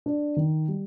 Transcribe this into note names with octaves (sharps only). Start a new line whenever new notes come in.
D4
D#3
G3